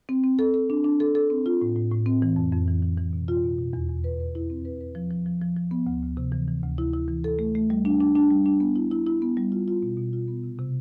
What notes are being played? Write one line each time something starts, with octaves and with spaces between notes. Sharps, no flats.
C4
C4
A4
A4
D4
D4
A4
A4
C4
F4
A2
A2
A2
C4
E3
F2
F2
E3
E3
E3
B2
F4
B2
B2
E2
E2
B4
B4
E4
C4
B4
B4
F3
F3
F3
F3
F3
B3
D2
D2
C3
E3
E3
D2
E4
E4
E3
A4
A3
A3
G3
D4
D4
D4
G3
D4
B3
E4
E4
E4
B3
G3
F4
F4
B2
B2
F4
B3
C3
C3